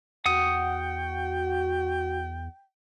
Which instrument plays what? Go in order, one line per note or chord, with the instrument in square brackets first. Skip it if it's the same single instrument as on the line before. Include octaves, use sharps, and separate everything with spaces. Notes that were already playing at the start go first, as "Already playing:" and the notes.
[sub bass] E2 [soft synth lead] F#4 [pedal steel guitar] F#5 D#6 [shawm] G5